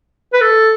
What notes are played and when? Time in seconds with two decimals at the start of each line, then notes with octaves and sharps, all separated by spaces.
0.34 B4
0.41 A4